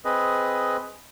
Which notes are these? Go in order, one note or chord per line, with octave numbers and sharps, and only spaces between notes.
C4 G#4 B4 D#5